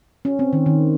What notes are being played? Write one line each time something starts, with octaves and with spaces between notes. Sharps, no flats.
C#4
C4
D#3
D#3